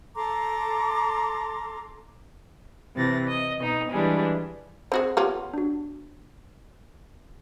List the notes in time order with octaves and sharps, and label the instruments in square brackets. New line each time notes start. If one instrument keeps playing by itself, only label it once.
[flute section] A4 A#5 C6 D6
[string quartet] C3 E3 A6 A#6
D#5
B2 D#4
E3 G3 G#3 D4
[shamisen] C4 F#4 G#4 [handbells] C5
[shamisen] B3 C#4 F4 [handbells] G4
[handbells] D4 F#4